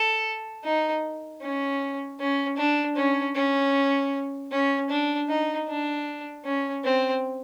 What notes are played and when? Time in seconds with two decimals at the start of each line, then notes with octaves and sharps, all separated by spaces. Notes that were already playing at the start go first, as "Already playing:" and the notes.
Already playing: A4
0.64 D#4
1.42 C#4
2.19 C#4
2.57 D4
2.96 C#4
3.35 C#4
4.52 C#4
4.90 D4
5.29 D#4
5.68 D4
6.45 C#4
6.84 C4